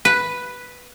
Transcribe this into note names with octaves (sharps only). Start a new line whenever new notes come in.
B4